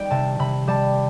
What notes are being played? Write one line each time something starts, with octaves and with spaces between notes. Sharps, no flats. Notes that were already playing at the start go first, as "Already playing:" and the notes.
Already playing: D#3 G3 G5
C3 A5
C3 B5
G3 A5